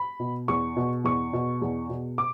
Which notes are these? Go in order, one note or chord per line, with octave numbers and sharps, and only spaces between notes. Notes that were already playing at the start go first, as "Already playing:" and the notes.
Already playing: B5
B2
E2 C#6
B2
E2 C#6
B2
E2
B2
D6